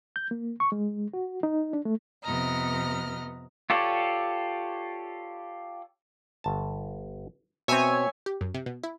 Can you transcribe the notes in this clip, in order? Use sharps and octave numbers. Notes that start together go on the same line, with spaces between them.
G6
A#3
C#6
G#3
F#4
D#4
D4
A3
F2 C3 B3 D#5 A#5 F6
F4 G4 A4 C#5 D5
G1 A5
B2 C4 C#5 E5 G#5
G4
F#2
C3
B2
E4